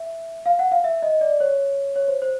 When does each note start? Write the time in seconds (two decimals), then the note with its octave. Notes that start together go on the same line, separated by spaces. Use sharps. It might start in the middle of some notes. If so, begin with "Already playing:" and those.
Already playing: E5
0.46 F5
0.59 F#5
0.72 F5
0.84 E5
1.02 D#5
1.21 D5
1.40 C#5
1.96 C#5
2.08 C5
2.22 C5